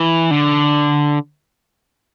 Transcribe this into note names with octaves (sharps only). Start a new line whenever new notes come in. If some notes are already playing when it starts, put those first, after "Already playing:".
Already playing: E3
D3